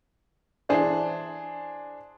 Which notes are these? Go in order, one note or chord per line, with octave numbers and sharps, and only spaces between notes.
E3 D4 G#4 C5 D5